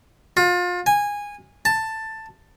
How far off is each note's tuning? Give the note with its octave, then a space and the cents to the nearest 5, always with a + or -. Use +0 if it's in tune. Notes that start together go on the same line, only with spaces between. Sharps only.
F4 +30
G#5 -15
A5 +10